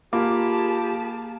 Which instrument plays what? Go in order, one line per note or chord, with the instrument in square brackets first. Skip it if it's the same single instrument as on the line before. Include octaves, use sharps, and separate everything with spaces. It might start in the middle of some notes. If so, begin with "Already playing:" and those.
[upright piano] A#3 [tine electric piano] F4 B5 D6 [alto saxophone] G4 [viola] G#4 A5